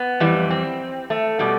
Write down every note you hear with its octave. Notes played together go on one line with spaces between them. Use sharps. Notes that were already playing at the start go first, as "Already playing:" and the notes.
Already playing: B3
F2 E3 G3
C4
A3
B2 G3